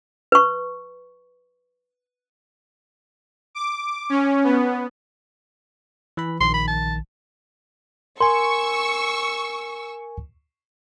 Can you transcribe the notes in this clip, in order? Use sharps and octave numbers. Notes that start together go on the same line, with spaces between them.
B4 C#6
D6
C#4
B3
E3 B4 B5
A#1 D#3 C6
B5
A5
A#4 G#5 C6 C#6 E6